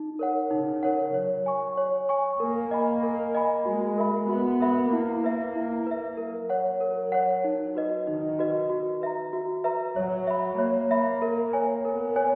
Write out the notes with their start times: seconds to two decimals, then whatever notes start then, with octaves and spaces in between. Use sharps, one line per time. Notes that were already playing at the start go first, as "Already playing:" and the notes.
Already playing: D#4
0.19 A#4 C#5 F#5
0.51 C#3 D#4
0.83 A#4 C#5 F#5
1.14 F#3 C#5
1.46 G#5 C#6
1.77 C#5
2.09 G#5 C#6
2.40 A#3 A#4
2.71 D#5 G#5 B5
3.03 A#4
3.35 D#5 G#5 B5
3.65 G#3 F#4
3.98 A#4 E5 B5
4.29 B3 F#4
4.61 A#4 E5 B5
4.92 A#3 E4
5.24 B4 E5
5.55 E4
5.87 B4 E5
6.17 F#3 A#4
6.49 C#5 F#5
6.81 A#4
7.12 C#5 F#5
7.44 D#4
7.75 F#4 B4 D#5
8.07 D#3 D#4
8.39 F#4 B4 D#5
8.70 F#4
9.02 B4 E5 A#5
9.33 F#4
9.64 B4 E5 A#5
9.96 F#3 C#5
10.27 E5 B5
10.58 A#3 C#5
10.91 E5 B5
11.22 A#4
11.53 C#5 G#5
11.84 B3 A#4
12.16 C#5 G#5